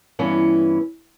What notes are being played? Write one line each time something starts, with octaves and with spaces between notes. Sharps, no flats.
G2 E3 B3 C#4